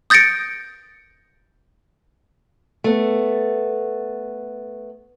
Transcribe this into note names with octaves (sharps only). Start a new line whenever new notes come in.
D#6 G6 A6 A#6 C#7 D7
A3 B3